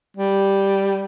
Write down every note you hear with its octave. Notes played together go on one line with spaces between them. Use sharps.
G3